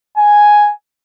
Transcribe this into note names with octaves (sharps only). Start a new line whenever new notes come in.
G#5